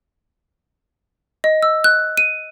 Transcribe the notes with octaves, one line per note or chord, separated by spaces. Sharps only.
D#5
E6
F#6
D#7